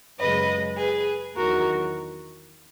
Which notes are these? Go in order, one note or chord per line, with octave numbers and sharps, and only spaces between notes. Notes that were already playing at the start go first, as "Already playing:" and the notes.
F#2 C#3 G#3 B4 D#5
G#4 B4
E2 D#3 F#3 F#4 A#4